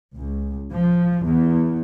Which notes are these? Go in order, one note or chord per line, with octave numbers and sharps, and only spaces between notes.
C#2
F3
E2